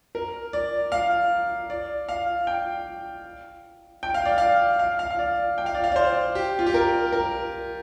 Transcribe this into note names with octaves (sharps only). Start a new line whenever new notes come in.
A#4
D5
F5
D5
F5
G5
G5
F5
D5
F5
F5
F5
F5
D5
G5
F5
D5
F5
D5
C5
G4
F4
G4
A#4
A#4